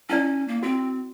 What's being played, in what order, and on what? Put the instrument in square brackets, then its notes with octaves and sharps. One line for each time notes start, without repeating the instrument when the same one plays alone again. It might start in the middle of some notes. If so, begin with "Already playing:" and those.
[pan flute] C#4 [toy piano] D#4 E4 D5
[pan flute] A#3
[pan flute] C4 [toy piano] F#4